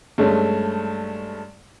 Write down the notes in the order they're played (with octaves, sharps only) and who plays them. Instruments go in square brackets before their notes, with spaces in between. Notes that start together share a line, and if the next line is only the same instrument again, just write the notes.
[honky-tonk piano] G2 G#3 A3 C#4